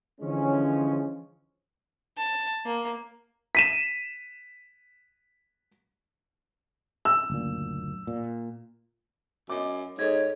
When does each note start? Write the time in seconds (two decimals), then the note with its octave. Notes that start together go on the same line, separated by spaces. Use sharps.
0.21 D3 E3 F3 G#3 C#4
2.17 A5
2.66 A#3
3.55 B6 D#7 E7
7.05 E6
7.30 F#1 D2 A#2
8.07 A#2
9.50 F#2 D#5 D6
9.99 G#2 A4 C#5 D#5 G#6